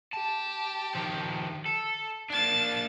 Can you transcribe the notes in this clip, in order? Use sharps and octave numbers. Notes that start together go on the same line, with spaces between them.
G4 A5
D#3 F3
A4
A#3 D4 A5 A6